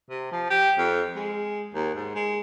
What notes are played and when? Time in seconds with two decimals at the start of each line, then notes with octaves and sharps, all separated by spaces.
0.09 C3
0.32 F3
0.50 G4
0.78 F2
1.15 G#3
1.74 D#2
1.94 G#2
2.15 G#3